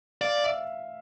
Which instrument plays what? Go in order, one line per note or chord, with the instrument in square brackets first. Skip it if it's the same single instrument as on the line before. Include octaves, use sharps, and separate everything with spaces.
[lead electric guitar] D5 [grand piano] F5
[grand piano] E5